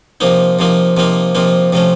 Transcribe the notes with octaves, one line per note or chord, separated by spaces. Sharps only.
C3 F3 A#3 D#4
C3 F3 A#3 D#4
C3 F3 A#3 D#4
C3 F3 A#3 D#4
C3 F3 A3 C#4